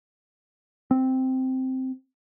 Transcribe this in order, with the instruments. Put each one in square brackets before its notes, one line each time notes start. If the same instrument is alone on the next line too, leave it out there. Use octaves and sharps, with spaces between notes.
[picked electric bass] C4